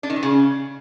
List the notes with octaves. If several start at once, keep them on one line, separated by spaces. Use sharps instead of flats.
D4
D#3
E3
C#3